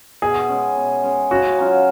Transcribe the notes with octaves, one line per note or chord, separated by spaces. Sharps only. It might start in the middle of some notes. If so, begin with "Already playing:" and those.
B2 G#4
G#3 C#4
B2
G#3 C#4
C#3 F#4
F#3 C#4 F4